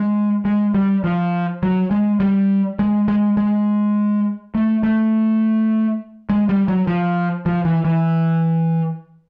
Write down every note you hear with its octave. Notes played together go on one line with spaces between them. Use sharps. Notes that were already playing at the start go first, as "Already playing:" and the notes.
Already playing: G#3
G#3
G3
F3
F#3
G#3
G3
G#3
G#3
G#3
A3
A3
G#3
G3
F#3
F3
F3
E3
E3